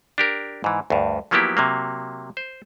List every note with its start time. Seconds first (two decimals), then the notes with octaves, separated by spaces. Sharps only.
0.18 D4 G4 A#4
0.64 G#2 E3
0.90 D2 G2
1.31 F3 F#3 A#3 B3 E4 G4
1.57 C3 F#3 A#3
2.37 C5